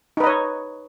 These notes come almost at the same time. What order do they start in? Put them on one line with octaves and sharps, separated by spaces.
D#4 B4 D#5 C#5